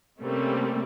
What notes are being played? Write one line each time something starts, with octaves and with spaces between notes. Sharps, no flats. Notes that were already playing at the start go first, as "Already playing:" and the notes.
C3 G3 A3 A#3 C4 C#4